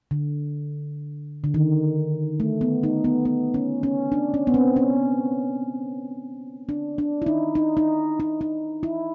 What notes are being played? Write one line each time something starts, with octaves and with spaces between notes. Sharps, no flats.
D3
D3
D#3
A3
B3
D#4
B3
B3
C#4
C#4
D4
C#4
B3
C4
C#4
D4
D4
E4
D#4
D#4
D#4
D#4
D#4
E4